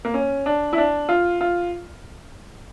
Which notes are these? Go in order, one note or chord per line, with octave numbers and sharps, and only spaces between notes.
A#3
C#4
D4
E4
D4
F4
F4